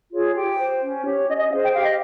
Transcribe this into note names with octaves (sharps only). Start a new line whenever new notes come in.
F4 G#4 C#5
G4 G5
C5
C#4
G4 C#5
C#4 D#5
D#5
G#4 C5 F5
G5
G4 F5
D#5